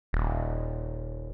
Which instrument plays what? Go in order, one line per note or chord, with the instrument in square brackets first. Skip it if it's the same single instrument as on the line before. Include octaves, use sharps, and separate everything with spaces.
[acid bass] D#1